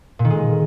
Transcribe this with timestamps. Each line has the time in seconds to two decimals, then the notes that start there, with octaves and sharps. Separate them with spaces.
0.19 A#2
0.25 D#3
0.30 G#3